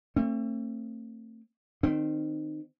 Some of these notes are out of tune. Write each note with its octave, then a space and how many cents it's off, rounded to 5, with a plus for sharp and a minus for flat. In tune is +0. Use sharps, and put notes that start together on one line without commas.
A3 +40 C4 +40
D#3 -25 C4 -10